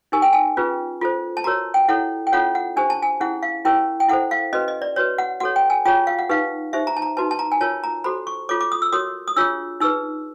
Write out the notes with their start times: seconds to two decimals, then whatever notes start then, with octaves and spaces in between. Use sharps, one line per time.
0.12 D#4 G4 A#4 G#5
0.22 G5
0.33 G#5
0.57 C#4 F4 G#4 B4
1.01 F4 A4 C5
1.37 A5
1.44 F#4 A#4 C#5 A#5
1.74 G5
1.88 E4 A4 C#5 F#5
2.27 G5
2.32 C#4 F4 A4 C#5 F#5
2.55 F#5
2.76 D4 G4 C5 G#5
2.90 A5
3.02 G#5
3.20 C#4 E4 G#4 F#5
3.43 F5
3.65 E4 G4 A#4 C#5 G5
4.00 G5
4.08 E4 A4 C5 F#5
4.31 F5
4.53 C#4 F#4 B4 D#5
4.68 D#5
4.82 D5
4.96 F#4 B4 C#5
5.18 F#5
5.40 F#4 A4 C#5 F#5
5.56 G5
5.70 G#5
5.86 F4 G#4 C#5 G5
6.07 F5
6.19 F#5
6.29 D#4 G4 B4 F5
6.73 D#4 G4 C5 E5
6.87 A#5
6.97 A5
7.02 A#5
7.17 D#4 F#4 B4 A5
7.31 A5
7.39 A#5
7.52 G#5
7.61 F4 A#4 C#5 A5
7.84 A#5
8.04 F#4 A4 C5 B5
8.27 C#6
8.49 F4 A4 C#5 D6
8.61 D6
8.72 D#6
8.82 E6
8.92 F#4 A#4 C#5 D#6
9.28 D#6
9.36 D4 F4 G#4 C#5 E6
9.80 D#4 G#4 B4 E6